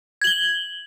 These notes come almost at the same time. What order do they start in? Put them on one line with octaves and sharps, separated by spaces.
G#6 F#7 G7